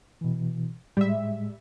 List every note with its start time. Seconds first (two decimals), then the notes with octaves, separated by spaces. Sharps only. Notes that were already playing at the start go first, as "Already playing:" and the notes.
0.21 B2 E3
0.97 A2 G3 G#3 E5